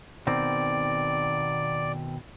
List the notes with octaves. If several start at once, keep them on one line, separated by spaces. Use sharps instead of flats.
B2 D#3 C4 D5